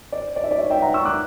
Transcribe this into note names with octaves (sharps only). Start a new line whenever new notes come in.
D5
D5
E5
D5
C#5 E5
E5 G5
F#5 A#5
C#6 E6
D6 F#6